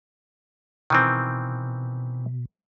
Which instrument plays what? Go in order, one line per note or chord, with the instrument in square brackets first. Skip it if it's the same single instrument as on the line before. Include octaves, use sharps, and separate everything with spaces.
[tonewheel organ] B2 [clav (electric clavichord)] D#3 E3 C4